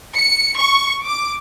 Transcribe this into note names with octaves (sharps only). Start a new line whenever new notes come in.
C#7
C#6
D6